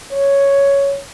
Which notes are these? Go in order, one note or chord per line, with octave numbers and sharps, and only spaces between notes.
C#5